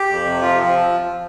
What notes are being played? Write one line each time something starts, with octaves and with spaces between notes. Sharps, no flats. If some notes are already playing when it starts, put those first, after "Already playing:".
Already playing: G4
F2
C3
F3 F4
F3 C4